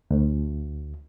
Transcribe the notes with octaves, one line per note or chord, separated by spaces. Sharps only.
D2